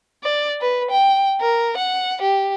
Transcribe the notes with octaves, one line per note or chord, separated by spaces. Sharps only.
D5
B4
G5
A#4
F#5
G4